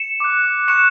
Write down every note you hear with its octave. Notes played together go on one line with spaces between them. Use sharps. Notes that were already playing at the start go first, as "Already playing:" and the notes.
Already playing: C#7 E7
D6 F#6
C#6 F#6 C#7 E7